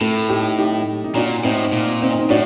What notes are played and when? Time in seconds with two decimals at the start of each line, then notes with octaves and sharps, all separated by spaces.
0.01 A2 A3
0.29 D#4 G4
0.58 D#4 G4
1.04 D#4
1.15 A#2 D4 F#4
1.44 A2 C4 D#4
1.72 A#2
2.02 C4 D#4
2.18 D#4
2.30 A2 D4 F#4